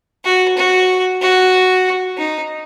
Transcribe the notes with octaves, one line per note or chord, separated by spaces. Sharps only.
F#4
F#4
F#4
D#4